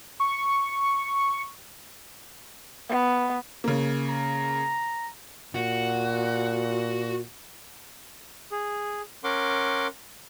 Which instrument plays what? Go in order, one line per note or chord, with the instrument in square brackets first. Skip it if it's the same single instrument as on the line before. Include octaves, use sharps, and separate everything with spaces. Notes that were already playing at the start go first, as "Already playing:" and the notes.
[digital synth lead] C#6
[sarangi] B3
[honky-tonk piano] C#3 A#3
[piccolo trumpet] A#5
[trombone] A#2 [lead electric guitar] F#4
[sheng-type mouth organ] G#4
C#4 A#4 F#5 C6 D6